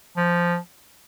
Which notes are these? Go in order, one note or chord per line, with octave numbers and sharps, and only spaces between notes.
F3